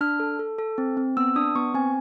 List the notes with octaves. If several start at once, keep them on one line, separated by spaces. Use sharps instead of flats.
D4 F6
A4
A4
A4
C4
C4
B3 E6
D4 D#6
B3 C#6
C4 G#5